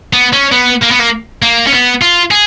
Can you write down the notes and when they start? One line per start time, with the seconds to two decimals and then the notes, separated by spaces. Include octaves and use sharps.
0.13 B3
0.33 C#4
0.52 B3
0.83 A#3
0.92 B3
1.00 A#3
1.42 A#3
1.67 C#4
1.72 B3
2.02 F4
2.31 G#4